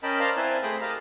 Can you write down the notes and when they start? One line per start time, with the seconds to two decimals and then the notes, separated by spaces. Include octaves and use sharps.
0.03 C#4 A#4 D#5 G5 A5 B5
0.20 A#4 C5 D5 F5 A5 A#5
0.37 C4 E4 B4 C5 G#5 A5
0.63 A3 G#4 C5 G5 B5 D#6
0.81 G4 A#4 D#5 F5 A5 A#5